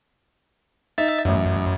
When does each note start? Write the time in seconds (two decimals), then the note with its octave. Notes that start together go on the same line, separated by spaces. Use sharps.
0.98 D#4 E5 A6
1.25 A1 F#2 E5